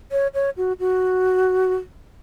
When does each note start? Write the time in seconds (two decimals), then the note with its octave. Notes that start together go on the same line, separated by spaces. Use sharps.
0.12 C#5
0.34 C#5
0.57 F#4
0.80 F#4